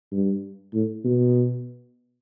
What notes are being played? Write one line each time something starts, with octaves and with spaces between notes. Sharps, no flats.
G2
A2
B2